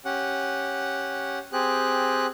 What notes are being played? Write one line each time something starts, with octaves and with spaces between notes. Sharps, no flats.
C#4 G4 F#5
C4 G4 G#4 F#6